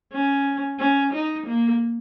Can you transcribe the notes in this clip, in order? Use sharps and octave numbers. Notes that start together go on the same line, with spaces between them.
C#4
C#4
D#4
A#3